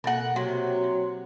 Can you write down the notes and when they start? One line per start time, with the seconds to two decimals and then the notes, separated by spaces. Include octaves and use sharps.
0.04 B2 A#3 A4 A#4 F#5
0.36 C3 F#3
0.84 C6